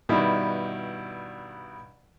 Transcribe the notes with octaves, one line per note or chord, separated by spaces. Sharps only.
G2 B2 D#3 G3 E4